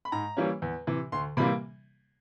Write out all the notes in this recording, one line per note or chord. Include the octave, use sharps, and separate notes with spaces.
B5
G#2 A#5
E3 G3 A#3 C#4
E2
C3 E3
D2 C6
C3 E3 G3 A#3 B5